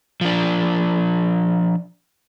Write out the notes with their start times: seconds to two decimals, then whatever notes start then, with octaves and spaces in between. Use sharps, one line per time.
0.21 F3 D4